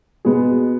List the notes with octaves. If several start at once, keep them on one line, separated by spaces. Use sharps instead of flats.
B2 G#3 B3 G#4